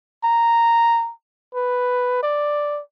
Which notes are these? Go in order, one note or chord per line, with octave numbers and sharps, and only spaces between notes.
A#5
B4
D5